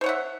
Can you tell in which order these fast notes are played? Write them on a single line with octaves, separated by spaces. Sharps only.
C5 C#5 F#5 E5